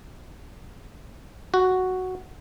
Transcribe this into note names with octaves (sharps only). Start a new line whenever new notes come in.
F#4